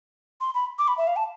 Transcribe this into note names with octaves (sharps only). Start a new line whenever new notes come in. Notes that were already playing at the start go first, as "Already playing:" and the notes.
C6
B5
D6
B5
E5
F5
A5